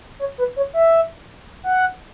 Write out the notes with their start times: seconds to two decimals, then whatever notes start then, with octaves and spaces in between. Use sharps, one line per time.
0.20 C#5
0.38 B4
0.56 C#5
0.74 E5
1.64 F#5